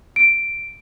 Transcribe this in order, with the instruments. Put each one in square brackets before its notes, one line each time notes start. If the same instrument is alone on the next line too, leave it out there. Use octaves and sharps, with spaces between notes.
[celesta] D7